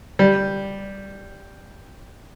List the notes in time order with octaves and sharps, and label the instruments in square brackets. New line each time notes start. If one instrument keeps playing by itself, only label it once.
[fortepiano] G3